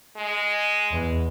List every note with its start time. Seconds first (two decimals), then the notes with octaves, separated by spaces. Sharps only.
0.17 G#3
0.91 E2